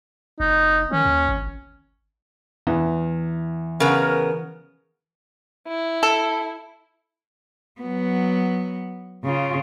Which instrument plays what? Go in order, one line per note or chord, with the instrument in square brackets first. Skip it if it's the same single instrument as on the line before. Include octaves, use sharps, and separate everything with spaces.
[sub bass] F#1 [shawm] D#4
[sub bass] D#3 [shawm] C#4
[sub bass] D#2
G#1
[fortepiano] E2 [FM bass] E3
[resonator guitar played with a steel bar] C#3 B3 [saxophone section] A#4
[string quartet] E4
[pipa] A4
[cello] F#3 B3
C#3 F4